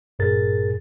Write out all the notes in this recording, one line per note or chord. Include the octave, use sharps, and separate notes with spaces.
G#1 G2 A#2 G#4 A#4 A6